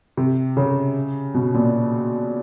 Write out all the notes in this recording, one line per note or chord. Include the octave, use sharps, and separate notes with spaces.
C3
C#3
B2
A#2